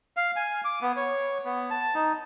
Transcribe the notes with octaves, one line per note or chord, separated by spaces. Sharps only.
F5
G#5
D6
B3
C#5
B3
A5
D#4